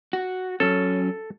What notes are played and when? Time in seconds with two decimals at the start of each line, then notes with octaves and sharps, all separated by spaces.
0.13 F#4
0.60 F#3 C#4 A4